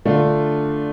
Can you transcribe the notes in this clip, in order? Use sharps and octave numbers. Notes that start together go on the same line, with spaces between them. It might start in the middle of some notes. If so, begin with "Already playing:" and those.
D3 A3 D4 F4